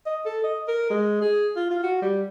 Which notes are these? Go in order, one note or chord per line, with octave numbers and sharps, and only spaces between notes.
D#5
A4
D#5
A#4
G#3
G#4
F4
F4
F#4
G3